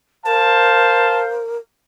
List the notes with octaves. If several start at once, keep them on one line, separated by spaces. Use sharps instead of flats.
A#4 C5 F5 A5